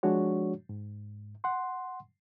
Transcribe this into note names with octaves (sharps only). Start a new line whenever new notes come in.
F3 G#3 D4 F#4 C#5
G#2
F#5 C6